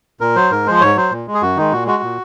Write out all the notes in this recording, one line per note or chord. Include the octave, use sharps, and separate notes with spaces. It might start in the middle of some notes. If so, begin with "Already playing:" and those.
A#2 A#4
F#3 C5
G#2 A#4
F3 G#3 C5
G#2 C#5
F#3 C5
A#2
G#3
G#4
F#2 F#4
D#3 G#3 D#4
A#2 F#4
G#3 F#4
A#2